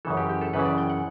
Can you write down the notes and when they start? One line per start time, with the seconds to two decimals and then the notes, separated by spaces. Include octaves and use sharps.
0.05 F#2 C#3 E3 A4
0.17 G4
0.29 G4
0.41 A4
0.54 F#2 C#3 E3 B4
0.65 D5
0.78 G5
0.90 F#5